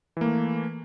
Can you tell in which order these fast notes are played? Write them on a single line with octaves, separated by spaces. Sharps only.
E3 A#3 A3